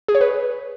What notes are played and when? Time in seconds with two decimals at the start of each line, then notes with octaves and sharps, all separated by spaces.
0.08 G#4
0.15 C#5
0.21 B4